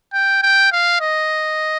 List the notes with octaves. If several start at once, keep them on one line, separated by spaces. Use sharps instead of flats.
G5
G5
F5
D#5